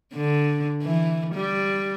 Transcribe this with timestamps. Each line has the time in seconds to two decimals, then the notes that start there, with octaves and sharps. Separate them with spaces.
0.14 D3
0.83 E3
1.35 G3